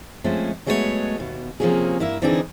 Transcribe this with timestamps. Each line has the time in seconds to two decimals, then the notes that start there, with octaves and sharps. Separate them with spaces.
0.24 F3 G#3 A3 C4 C#4
0.66 F#3 G#3 A3 B3 F#4 C#5
1.18 D#2 B2
1.60 C3 F3 F#3 A#3 C#4 G#4
2.00 G2 A#3 E4 A#4 E5
2.22 D3 E3 C4 D4 D#4 G#4